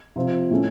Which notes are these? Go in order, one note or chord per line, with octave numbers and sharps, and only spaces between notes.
C3 F3 C4 F4
A2 A3 C#4